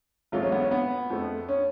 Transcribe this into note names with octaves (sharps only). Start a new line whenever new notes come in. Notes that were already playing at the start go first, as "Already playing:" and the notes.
A1 G#2 F#3 A3 F4
C#4
B3
C#4
B3
F2 F3 A3
C#4